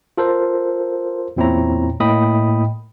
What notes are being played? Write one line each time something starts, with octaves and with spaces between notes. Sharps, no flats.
F4 A4 A#4 C5
E2 A#2 C4 E4 C#5 A#5
A2 A#3 D#5 G5 B5 D#6